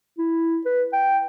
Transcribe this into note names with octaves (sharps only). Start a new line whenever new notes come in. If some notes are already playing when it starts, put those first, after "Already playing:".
E4
B4
G5